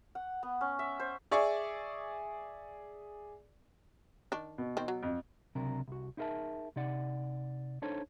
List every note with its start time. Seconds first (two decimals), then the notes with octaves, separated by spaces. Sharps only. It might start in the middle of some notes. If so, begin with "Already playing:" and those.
0.15 F#5
0.43 B3
0.61 C#4
0.79 E5
1.00 C5
1.31 G#4 D5 E5 C#6
4.32 D#3 D4
4.58 B2
4.77 D#3 C4
4.88 F#3
5.03 F2
5.55 C#2 C3 F#3 D4 A#4 A#5
5.88 C2 F#4
6.17 D#4 E4 G#4 A#4 E5 A5
6.76 C3 D#4 D5 F#5
7.82 D4 D#4 A4 C5 C#5